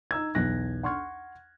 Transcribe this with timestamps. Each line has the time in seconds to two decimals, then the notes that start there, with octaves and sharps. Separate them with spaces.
0.11 D#4 A#5 E6 G#6
0.35 B1 E2 F#6 A#6
0.83 F#5 C6 C#6 F6 G#6